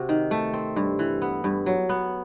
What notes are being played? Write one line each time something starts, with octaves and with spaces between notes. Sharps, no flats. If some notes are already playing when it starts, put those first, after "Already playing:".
Already playing: C3 F#4
D#3
A3
C4
G2
E3
B3
G2
F#3
B3